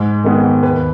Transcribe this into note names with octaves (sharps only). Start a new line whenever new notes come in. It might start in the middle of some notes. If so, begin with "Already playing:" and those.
Already playing: G#2
D#3 G#3 B3
D#2 B4